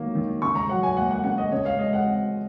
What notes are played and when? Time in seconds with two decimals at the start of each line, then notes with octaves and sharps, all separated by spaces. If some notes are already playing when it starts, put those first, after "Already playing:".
Already playing: D#3 F#3 A#3
0.15 D#3
0.42 C#3 C#6
0.55 A#5
0.69 F#3 F#5
0.83 G#5
0.97 A#3 F#5
1.11 F#5
1.24 C#3 F#5
1.38 D#5
1.52 C#3 C#5
1.66 F5
1.79 G#3 D#5
1.93 F#5
2.06 C4